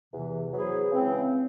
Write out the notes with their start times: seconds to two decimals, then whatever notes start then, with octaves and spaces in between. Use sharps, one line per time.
0.13 E2 C3 E3
0.53 F#3 B3 E4 G#4 C5
0.92 C#3 E3 G#3 C4